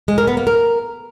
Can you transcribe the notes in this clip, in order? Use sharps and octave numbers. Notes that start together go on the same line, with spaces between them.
G#3
A#4
B3
A#3
A#4